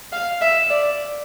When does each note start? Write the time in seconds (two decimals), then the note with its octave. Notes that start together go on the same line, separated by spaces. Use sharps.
0.12 F5
0.41 E5
0.70 D5